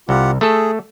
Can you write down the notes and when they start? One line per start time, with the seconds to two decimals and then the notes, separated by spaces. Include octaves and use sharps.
0.09 C2 F4 G4 F#5
0.41 A3 G#4 A4